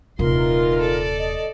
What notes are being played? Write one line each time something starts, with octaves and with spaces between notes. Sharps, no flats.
D#1 C3 E3 D#4 F4 A#4 C6
A4 D5
D#5